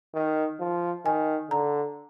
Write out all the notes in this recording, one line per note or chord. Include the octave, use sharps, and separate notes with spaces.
D#3
F3
D#3 G#5
D3 A#5